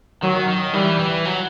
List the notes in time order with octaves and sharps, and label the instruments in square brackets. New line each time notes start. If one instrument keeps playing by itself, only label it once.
[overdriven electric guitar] D#3 [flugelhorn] F#3
[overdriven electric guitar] D#3
[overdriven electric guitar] E3 [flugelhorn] G3
[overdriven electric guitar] E3
F#3